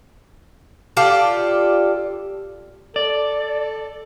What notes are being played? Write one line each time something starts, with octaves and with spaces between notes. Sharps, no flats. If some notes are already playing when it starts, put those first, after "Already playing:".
F4 G4 A4 D5
A4 D5